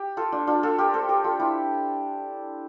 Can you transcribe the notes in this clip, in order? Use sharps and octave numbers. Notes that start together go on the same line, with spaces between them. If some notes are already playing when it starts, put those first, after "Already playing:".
Already playing: G4
F4 A4
D4 F4
D4 F4
F4 A4
G4 A#4
A4 C5
G4 A#4
F4 A4
E4 G4